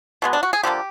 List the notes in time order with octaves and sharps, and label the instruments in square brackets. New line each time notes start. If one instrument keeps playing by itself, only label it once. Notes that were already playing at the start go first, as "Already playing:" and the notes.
[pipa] B2 G#3 B3
D4
F#4
G#4
D3 F3 A#3 G4